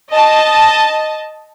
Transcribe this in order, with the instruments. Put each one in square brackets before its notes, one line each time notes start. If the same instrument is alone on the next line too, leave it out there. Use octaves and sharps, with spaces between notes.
[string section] D#5 A5